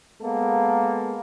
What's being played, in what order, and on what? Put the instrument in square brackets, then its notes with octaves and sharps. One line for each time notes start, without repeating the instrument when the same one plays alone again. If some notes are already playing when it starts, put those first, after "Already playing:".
[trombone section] G#3 A#3 B3 A4